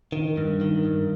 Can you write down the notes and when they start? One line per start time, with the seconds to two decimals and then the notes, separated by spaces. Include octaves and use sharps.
0.12 D#3
0.37 G2
0.61 D#3
0.85 G2